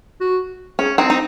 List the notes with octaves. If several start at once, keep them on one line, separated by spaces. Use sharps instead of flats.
F#4
C#4 G#4
C4 D#4
D#4